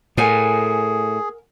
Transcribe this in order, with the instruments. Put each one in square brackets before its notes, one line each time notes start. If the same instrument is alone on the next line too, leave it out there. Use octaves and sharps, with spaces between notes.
[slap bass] A2 [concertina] G#4 [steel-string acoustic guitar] A#4 F#5 G#5